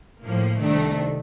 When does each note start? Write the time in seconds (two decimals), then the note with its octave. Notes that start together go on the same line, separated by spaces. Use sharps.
0.23 A2 F3 A#3
0.59 C2 C3 D#3 A3 D4